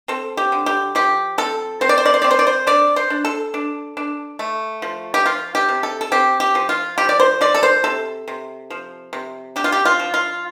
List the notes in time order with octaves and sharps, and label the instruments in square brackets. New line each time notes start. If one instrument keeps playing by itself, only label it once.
[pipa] C4 A4
G4
D3
G4
F3 G4
C4 A4
C4 C5
D5
C5
D5
C5
C4 D5
C5
D5
C5
D4 D5
C5
D4
A4
D4
D4
A3
F3
G4
F3 F4
G4
C3
A4
A4
C4 G4
G4
F3
F4
F3 G4
D5
C5
F3 D5
A4
C5
C3 A4
C3
F3
C3
D4 G4
F4
G4
F4
F3
F4